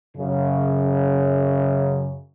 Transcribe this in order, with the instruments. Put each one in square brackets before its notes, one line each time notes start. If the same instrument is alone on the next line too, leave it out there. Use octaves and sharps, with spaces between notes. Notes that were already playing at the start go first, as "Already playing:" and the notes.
[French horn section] F#2 C#3